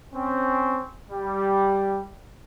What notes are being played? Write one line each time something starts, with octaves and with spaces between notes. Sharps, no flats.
C4 C#4
G3